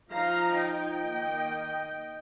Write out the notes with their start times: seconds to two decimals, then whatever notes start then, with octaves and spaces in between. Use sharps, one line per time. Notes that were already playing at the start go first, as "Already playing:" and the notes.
0.10 F3 D#4 F5 A#5
0.56 D#5 G5
1.02 D#3 A#3 D#4